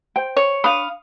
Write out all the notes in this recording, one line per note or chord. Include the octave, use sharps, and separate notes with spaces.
C5 G5
C#5
D4 F5 B5 D#6